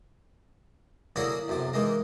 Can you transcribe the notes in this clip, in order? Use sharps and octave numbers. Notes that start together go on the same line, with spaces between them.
D3 F#3 A#3 E4 F#4 G#4
B1 F#2 C3 D6
D#3 E3 G#3 A#3